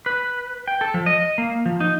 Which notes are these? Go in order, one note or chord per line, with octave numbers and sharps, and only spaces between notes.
B4
G5
A4
F3
D#5
A#3
F3
D#4